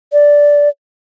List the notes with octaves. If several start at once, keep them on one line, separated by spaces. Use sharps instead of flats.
D5